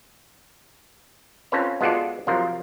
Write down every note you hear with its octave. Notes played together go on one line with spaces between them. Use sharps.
C4 C#4 F4 A4 B4 C#5
G#3 B3 F4 F#4 A4 D5
C3 F3 F#3 F4 A#4